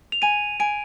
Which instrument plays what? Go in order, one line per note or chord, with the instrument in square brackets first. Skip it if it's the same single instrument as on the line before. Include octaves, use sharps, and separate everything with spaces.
[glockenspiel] F7
[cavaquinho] G#5 [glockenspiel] D#7
[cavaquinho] G#5 [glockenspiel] D7